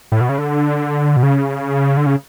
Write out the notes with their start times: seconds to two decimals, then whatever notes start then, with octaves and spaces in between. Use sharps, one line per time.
0.12 A2
0.21 B2
0.29 C#3
0.38 D3
1.16 B2
1.23 C#3
1.97 D3
2.06 C#3